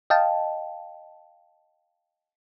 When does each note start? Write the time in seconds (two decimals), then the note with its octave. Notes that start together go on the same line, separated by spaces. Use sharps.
0.10 D#5 F5 G5 A5